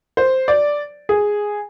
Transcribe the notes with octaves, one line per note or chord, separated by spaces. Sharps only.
C5
D5
G#4